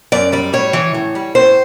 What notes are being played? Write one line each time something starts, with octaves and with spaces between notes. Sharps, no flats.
F#2 D5
G3 D5
A2 C#5
E3
A2
G3
A2 C5